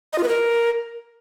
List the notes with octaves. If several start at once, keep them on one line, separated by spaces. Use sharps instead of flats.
D#5
F4
B4
A#4